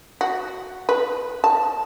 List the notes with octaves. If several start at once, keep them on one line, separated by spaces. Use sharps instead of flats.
F#4
B4
A5